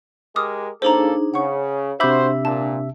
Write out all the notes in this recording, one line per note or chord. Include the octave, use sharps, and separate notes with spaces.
G#3 G4 A#4 D6 D#6 F6
C#3 A#3 D4 D#4 G#4 A4 C5 A#5
C#3 C#5 F#5 C#6
C3 D4 F#4 C5 E5 B5 D6 G6
A#2 A5